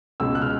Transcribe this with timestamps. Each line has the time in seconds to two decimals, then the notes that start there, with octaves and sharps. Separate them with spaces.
0.20 C#2 B2 G#3 E6
0.35 F#6
0.42 F6